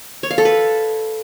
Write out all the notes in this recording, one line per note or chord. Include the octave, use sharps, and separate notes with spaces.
C#5
F5
A4
B4